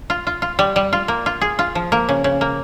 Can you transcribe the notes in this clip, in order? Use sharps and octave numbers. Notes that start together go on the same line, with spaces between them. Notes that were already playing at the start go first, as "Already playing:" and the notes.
F4
F4
F4
G3
G3
F4
A#3
F4
G#4
F4
F3
A#3
C#3
C#3
A#3